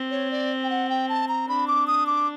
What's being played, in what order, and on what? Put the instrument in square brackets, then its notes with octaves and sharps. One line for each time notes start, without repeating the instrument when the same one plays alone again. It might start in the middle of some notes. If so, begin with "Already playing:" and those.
Already playing: [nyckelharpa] C4
[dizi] C#5
D5
G5
F#5
G5
A5
A#5
[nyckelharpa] D4 [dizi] B5
[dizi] D6
D#6
D6